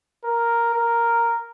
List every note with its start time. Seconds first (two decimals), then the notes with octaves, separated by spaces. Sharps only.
0.24 A#4
0.74 A#4